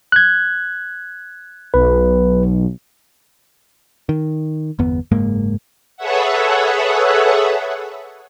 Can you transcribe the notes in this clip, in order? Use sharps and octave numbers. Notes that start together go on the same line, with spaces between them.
F#6 G#6
B1 B4
D#3
G1 E2 B3
F#1 G#2 G#3 A#3
G#4 A4 B4 C#5 E5 F#5